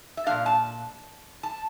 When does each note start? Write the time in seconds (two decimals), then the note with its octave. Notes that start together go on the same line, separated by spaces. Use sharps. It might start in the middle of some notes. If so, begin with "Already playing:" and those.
0.17 E5
0.26 A#2 G3 D4 F5
0.46 A5
1.43 A5